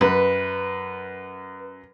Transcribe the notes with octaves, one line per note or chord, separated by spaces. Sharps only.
F#2 B4